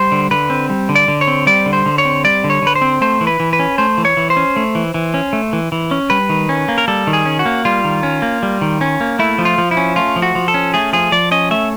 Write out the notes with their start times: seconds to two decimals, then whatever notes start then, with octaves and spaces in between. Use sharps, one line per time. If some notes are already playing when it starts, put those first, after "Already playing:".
Already playing: G3 C5
0.12 D3
0.31 D3 B4
0.50 C4
0.70 G3
0.89 D3
0.95 D5
1.08 D3
1.21 C#5
1.28 C4
1.47 G3 D5
1.66 D3
1.73 C5
1.86 D3
1.98 C#5
2.05 C4
2.24 G3 D5
2.44 D3
2.50 C#5
2.62 D3 B4
2.75 C5
2.82 C4
3.01 A3 C5
3.21 E3
3.27 B4
3.40 E3
3.53 B4
3.59 C#4
3.78 A3 C5
3.98 E3
4.05 C#5
4.17 E3
4.30 C5
4.37 C#4
4.56 A3
4.75 E3
4.94 E3
5.14 C#4
5.33 A3
5.53 E3
5.72 E3
5.91 C#4
6.10 G3 B4
6.29 D#3
6.49 C#4
6.68 A#3
6.78 A#4
6.88 G3 A4
7.07 D#3
7.13 G#4
7.26 C#4
7.39 F#4
7.46 A#3
7.65 G3 F4
7.85 D#3
8.03 C#4
8.22 A#3
8.43 G3
8.61 D#3
8.81 C#4
9.01 A#3
9.19 A3 E4
9.38 F3
9.45 F4
9.58 F3
9.71 E4
9.77 C#4
9.96 A3 F4
10.16 F3
10.22 F#4
10.35 F3
10.48 A4
10.54 C#4
10.74 A3 G#4
10.93 F3 G#4
11.12 F3 D5
11.31 C#4 D#5
11.51 A3 E5